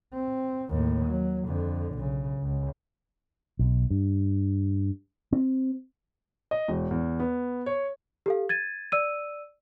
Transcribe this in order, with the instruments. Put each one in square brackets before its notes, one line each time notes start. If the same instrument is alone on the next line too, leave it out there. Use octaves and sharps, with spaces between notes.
[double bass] C4
D#2 A2
F#3
F2 D3
B1 C#3
C#2
[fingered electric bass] B1
G2
C4
[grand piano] D#5
E1
E2
B3
C#5
[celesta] G4 A4 F5
G#6 A6 D#7
D5 E6 D#7